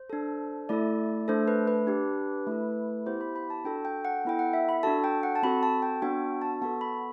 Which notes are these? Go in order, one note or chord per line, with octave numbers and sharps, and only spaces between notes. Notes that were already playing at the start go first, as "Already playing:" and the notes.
Already playing: C5
D4 A4
A3 E4 A4 D5
A3 D4 A4 C5
B4
B4
D4 G4
A3 E4 A4
B3 E4 G4 C5
B5
B5
A5
D4 F#4 A4 G5
G5
F#5
B3 E4 A4 G5
F#5
E5
B5
D4 F#4 A4 A5
G5
F#5
A5
C4 F#4 A4 B5
A5
G5
B3 D4 F#4 G5
A5
B3 F#4 A4 A5
B5